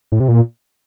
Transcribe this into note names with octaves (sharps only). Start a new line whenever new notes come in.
A2
C3
A#2